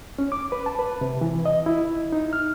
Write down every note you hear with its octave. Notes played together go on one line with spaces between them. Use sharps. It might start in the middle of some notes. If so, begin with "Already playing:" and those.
C#4
D6
B4
A5
B4
C3
E3
D#5
E4
D#4
F6